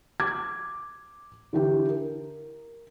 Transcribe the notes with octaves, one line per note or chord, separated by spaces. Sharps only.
D6 G#6
D3 E3 G4
A#4